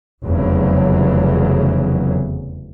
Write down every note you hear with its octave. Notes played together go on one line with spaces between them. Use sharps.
F1 E2 C#3 F#3